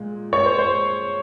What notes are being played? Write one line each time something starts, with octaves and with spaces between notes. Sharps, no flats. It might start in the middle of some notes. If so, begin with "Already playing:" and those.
Already playing: A#2 G#3
C#5
C5
C5